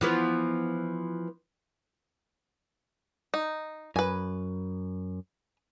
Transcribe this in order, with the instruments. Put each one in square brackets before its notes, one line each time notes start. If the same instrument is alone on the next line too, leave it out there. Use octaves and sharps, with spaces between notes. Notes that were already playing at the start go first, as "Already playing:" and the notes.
[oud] E3 F3 B3
[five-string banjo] D#4
[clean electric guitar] F#2 [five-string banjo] B4 G#5